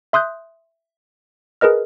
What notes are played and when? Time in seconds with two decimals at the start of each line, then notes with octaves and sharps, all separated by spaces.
0.13 E5 C6 D#6 F#6 G6
1.61 G#4 A#4 B4 D#5 F6